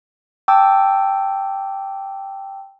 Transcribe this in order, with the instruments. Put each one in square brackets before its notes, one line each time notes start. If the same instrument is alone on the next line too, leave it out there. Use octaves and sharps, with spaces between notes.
[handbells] G5 A5 D6 E6